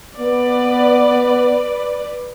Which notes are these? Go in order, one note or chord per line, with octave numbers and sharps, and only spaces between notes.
B3 B4 D5